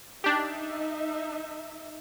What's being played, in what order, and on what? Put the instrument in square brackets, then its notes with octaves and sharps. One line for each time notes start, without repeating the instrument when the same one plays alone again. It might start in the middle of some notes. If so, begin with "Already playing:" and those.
[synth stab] D4 G4 [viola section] D#4 E5